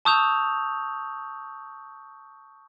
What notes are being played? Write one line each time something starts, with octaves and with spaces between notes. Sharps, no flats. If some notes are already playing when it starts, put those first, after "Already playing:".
A5 C#6 D#6 E6 G6 F7